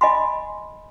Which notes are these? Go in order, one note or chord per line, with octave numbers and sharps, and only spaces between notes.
D#5 G#5 B5 C6